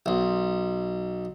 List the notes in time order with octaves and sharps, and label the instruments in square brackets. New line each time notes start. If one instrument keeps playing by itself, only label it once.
[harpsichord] B1